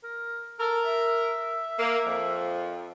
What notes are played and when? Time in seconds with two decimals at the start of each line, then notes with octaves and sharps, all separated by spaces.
0.03 A#4
0.59 A4 A#4
0.85 E5
1.78 A#3
2.05 F2 F3